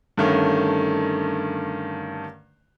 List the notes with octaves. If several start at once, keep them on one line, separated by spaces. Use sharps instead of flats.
G2 D3 D#3 A3 C#4